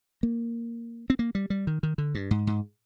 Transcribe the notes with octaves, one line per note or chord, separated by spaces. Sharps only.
A#3
C4
A#3
G3
G3
D#3
D#3
D3
G2
G#2
G#2